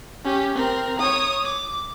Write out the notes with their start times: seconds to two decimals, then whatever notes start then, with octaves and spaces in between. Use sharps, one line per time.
0.25 C#4 G4
0.55 C4 A#4
0.99 C#5 D#6
1.45 D6